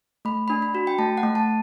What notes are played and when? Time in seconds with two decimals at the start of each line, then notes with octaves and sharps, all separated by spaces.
0.25 A3 B5
0.48 D4 B5
0.62 B5
0.75 F#4
0.87 G5
0.99 A3 A5
1.17 F#5
1.23 A3
1.35 A5